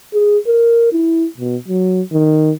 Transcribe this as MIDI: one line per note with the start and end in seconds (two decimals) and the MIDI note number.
0.14 0.38 68
0.47 0.91 70
0.93 1.26 64
1.38 1.56 47
1.68 2.02 54
2.12 2.52 51